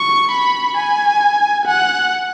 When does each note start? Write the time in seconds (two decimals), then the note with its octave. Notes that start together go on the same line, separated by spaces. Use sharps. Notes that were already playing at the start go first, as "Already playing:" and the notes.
Already playing: C#6
0.32 B5
0.77 G#5
1.66 F#5